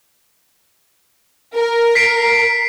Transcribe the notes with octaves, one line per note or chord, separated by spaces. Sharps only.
A#4
B6 C7 D7